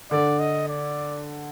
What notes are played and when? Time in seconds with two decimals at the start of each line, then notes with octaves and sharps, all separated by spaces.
0.11 D3 D5
0.39 D#5
0.68 D5